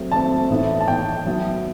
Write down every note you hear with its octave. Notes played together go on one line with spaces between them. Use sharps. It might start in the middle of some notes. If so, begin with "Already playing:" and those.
Already playing: F#3 A3 C4
F#3 A3 C4 A5
A2 E3 B3 D#4
A5
A2 E3 B3 D#4 G5
F#3 B3 E4